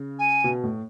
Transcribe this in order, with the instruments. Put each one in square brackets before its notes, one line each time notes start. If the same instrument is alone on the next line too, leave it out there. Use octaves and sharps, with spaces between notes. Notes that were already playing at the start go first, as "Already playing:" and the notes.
Already playing: [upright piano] C#3
[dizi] G#5
[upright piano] B2
A2